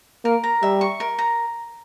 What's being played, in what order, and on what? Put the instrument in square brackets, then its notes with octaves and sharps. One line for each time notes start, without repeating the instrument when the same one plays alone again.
[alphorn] A#3 [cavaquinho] A#4
[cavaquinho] A#5
[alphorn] G3 [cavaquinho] E5
[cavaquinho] C#6
A#4
A#5